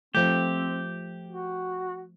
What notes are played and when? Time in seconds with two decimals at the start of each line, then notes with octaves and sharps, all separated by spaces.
0.15 F3 A3 C4 G4
1.27 F#4